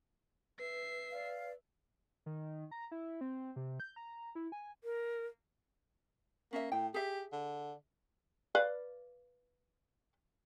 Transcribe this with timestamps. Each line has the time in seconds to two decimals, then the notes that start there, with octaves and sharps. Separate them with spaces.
0.59 B4 E5 C7
1.10 D5 F5
2.26 D#3
2.71 A#5
2.91 E4
3.21 C4
3.56 C3
3.80 G6
3.96 A#5
4.35 E4
4.52 G#5
4.84 A#4
6.53 A#3 C#4 E5
6.72 A2 G5
6.94 G4 G#4 E5
7.32 D3
8.55 B4 D5 F5